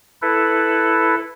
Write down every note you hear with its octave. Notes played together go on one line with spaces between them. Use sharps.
E4 A4 B4